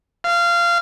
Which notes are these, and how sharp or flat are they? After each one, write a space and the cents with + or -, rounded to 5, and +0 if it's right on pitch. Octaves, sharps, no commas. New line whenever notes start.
F5 -20